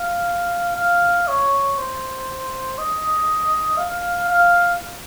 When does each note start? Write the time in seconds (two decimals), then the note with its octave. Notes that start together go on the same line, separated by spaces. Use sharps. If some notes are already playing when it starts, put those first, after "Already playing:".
Already playing: F5
0.76 F5
1.28 C#5
1.78 C5
2.79 D#5
3.78 F5
4.29 F5